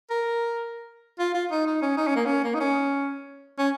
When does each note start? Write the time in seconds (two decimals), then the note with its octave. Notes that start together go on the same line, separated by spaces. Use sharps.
0.10 A#4
1.19 F4
1.34 F4
1.51 D#4
1.66 D#4
1.82 C#4
1.97 D#4
2.07 C#4
2.16 A#3
2.26 C#4
2.44 A#3
2.54 D#4
2.60 C#4
3.58 C#4